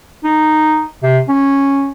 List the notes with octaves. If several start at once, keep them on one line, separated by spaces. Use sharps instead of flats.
D#4
C3
C#4